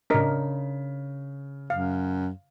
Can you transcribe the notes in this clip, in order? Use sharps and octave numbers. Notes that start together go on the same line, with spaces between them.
C#3 D4 A#4 D#5 B6
F#2 F5